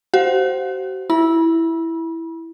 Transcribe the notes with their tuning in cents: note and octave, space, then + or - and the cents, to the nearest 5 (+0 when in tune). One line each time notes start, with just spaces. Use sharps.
F#4 +45 C5 +0 F5 +45
E4 +0 B5 -35